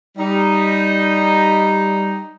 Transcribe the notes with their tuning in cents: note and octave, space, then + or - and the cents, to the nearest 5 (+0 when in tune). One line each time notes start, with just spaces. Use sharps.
G3 +0 D#4 +0